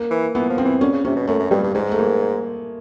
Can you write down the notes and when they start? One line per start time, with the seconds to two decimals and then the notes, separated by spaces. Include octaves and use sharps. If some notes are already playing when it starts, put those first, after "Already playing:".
Already playing: A#3
0.11 E3
0.35 E3 B3
0.49 F3
0.58 C4
0.65 E3
0.81 D3 C#4
0.92 C#3
1.05 C3 C#4
1.16 B2
1.27 F#2 A3
1.39 F#2
1.51 G2 G3
1.63 G2
1.75 G#2 G#3
1.92 A3
1.99 A#3